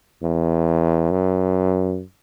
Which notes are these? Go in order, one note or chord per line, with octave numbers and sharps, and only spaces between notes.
E2
F#2